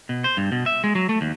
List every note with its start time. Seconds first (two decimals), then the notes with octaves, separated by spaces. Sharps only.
0.09 B2
0.24 C5
0.37 G2
0.52 B2
0.66 E5
0.84 G#3
0.95 F#3
1.09 A3
1.21 D#2